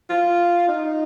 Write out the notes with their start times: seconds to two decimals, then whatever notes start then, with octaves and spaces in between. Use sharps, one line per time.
0.09 F4
0.68 D#4